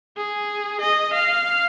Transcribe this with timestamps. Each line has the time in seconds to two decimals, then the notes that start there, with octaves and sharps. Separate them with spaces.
0.17 G#4
0.81 D#5
1.13 F5